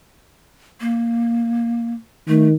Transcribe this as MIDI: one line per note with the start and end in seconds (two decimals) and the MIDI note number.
0.81 1.94 58
2.28 2.54 51
2.28 2.47 57